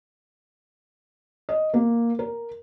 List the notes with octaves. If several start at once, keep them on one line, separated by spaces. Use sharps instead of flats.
D#5
A#3
A#4